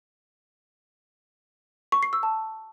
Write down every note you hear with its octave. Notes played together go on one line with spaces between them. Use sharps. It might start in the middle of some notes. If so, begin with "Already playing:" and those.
C#6
C7
E6
A5